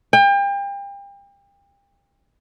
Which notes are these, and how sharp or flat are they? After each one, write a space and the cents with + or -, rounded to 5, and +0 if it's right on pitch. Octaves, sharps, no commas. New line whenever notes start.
G5 +35